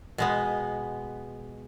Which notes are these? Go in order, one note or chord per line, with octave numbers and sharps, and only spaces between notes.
B2 G#3 B3